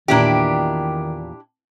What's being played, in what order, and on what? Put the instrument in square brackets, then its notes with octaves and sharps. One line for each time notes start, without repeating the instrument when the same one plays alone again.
[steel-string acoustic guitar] E2 A#2 A#5 [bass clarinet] D#3 [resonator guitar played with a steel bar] D4 E4 G4